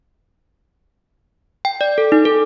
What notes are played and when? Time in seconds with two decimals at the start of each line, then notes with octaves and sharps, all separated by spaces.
1.65 G5
1.81 D5
1.98 A4
2.12 D#4
2.25 A4